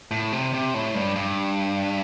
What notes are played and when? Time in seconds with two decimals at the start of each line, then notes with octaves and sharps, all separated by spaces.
0.11 A2
0.32 C3
0.54 C3
0.74 A2
0.95 G2
1.16 G2